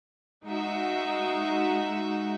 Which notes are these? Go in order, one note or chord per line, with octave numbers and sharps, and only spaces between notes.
G#3 D#4 F#4 E5